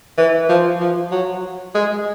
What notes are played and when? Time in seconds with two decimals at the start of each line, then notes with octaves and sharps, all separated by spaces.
0.18 E3
0.49 F3
0.80 F3
1.11 F#3
1.75 G#3